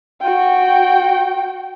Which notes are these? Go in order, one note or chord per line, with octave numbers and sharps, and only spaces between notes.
F#4 G5